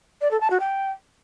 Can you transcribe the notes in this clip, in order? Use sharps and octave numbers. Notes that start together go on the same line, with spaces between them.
D5
A4
A5
F#4
G5